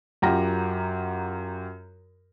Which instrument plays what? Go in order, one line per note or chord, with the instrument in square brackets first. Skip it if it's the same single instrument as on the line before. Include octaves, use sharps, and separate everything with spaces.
[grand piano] F#2 F4 G4 F#5 A#5 A#6